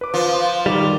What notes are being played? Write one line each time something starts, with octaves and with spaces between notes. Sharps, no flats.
B4 D6
F3 C5
D#3 G3 D6